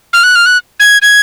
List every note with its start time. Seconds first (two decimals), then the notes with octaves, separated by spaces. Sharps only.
0.13 F6
0.23 F#6
0.35 F6
0.46 F#6
0.80 G#6
1.02 G#6